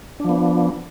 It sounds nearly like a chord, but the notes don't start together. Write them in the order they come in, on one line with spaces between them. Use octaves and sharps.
D4 F3 B3